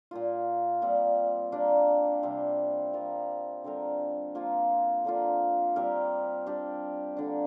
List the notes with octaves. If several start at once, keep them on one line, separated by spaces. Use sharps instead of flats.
A#2 A#3 F4
A#2 G3 C4
G3 A#3 D4
C3 G3 C4
G3 C4 F4 A#4
D3 G3 C4 A#4
F3 A#3 F4
D3 A#3 F4
G3 C4 G4 A#4
G3 D4 G4
D3 A#3 D4